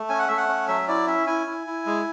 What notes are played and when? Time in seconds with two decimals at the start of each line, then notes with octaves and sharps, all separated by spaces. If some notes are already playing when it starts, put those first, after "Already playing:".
Already playing: A3
0.10 C#4 G#5
0.19 F#5
0.28 A3 E5
0.37 F#5
0.48 C#4
0.68 F#3 E5
0.88 E4 D5
1.07 C#4 E5
1.27 E4 G#5
1.47 E4
1.67 E4
1.86 G#3